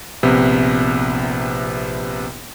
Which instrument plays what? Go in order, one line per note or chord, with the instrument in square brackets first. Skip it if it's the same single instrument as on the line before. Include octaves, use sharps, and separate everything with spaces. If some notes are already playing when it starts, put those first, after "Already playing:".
[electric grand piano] A#1 C3 B3